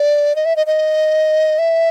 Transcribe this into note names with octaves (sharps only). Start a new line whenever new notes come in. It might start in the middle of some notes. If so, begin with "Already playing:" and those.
Already playing: D5
D#5
E5
D#5
D#5
E5